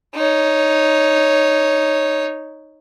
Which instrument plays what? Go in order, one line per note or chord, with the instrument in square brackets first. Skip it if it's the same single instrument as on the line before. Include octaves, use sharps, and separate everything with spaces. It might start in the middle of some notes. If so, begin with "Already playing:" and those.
[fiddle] D#4 C#5